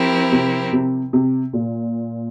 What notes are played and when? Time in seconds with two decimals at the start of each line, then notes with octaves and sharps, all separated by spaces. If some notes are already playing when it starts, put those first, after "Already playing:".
Already playing: F3 C4 E4 G4 A#4
0.32 C3
0.73 C3
1.13 C3
1.53 A#2